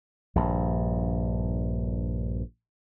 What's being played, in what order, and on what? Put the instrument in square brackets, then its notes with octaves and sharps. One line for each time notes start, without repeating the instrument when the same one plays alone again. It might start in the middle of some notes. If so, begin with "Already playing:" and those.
[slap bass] A#1 G2